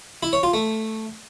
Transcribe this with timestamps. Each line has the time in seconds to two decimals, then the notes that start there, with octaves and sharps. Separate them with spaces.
0.23 E4
0.33 C#5
0.43 F4
0.54 A3